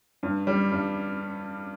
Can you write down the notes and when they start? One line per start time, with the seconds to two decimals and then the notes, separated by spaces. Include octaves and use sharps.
0.23 G2
0.47 G3
0.71 G2